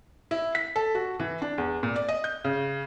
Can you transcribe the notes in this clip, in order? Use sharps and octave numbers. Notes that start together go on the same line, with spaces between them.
E4
B6
A4
F#4
E3
D4
E2
A#2
D5
D#5
G6
C#3